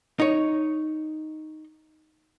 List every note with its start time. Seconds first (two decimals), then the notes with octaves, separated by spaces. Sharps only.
0.20 D#4 C#5